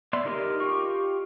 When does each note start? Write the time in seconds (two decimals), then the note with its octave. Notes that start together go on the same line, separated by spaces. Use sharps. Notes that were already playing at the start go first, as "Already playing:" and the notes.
0.13 B3 D5 E5 C6
0.26 D#4 G4 A#4 D#5
0.60 F4 G4 C#6